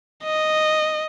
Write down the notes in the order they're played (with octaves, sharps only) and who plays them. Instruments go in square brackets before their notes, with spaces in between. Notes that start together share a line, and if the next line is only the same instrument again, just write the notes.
[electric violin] D#5